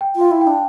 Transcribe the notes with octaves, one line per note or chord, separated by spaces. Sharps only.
G5
F4 F5
E4
G5
D4